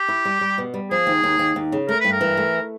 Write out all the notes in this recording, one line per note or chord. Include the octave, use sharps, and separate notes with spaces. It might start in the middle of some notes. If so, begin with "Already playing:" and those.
Already playing: G4
E4
G3
G3
B2
G3
F3 G#4
D#2
D#2
D#2
D#2
C#3
A3 A#4
G2 B4
A#4
E3
A3